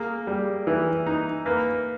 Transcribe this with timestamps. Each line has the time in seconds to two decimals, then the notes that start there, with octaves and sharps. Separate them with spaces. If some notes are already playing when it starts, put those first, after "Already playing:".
Already playing: A#3 G#4
0.27 G3
0.67 E3
1.07 D#4
1.45 A#3 B4